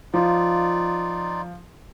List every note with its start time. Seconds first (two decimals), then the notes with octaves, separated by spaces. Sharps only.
0.14 F3 D#4 F4 D5